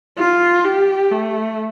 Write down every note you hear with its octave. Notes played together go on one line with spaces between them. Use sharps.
F4
G4
A3